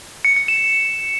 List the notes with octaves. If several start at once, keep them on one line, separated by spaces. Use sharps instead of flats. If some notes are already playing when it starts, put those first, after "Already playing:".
C#7
C#7
E7